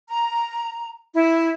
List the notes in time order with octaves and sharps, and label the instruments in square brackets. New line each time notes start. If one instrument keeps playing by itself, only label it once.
[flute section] A#5
E4